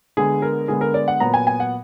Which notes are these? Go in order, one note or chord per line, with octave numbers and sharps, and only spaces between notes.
D3 G#3 B3 G#4
A#4
D3 G#3 B3 G#4
A#4
D5
F#5
A#2 F#3 B3 A#5
G#5
G#5
F#5